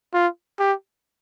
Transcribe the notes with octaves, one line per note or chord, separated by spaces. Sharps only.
F4
G4